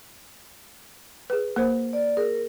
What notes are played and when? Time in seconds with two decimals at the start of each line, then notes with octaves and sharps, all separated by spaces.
1.30 G#4 B4
1.56 A#3 A#4 C5
1.93 D5
2.17 G#4 A#4